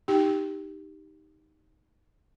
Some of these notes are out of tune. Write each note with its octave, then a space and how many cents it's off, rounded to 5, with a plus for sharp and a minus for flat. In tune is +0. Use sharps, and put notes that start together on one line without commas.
D#4 +0 G4 +0 G5 +0